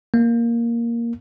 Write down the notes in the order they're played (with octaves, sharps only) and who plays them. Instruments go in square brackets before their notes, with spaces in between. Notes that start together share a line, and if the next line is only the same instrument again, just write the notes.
[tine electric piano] A#3